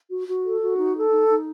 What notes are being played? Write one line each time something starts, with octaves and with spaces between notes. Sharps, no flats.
F#4
F#4
A4
F#4
D#4
A4
D#4
D#4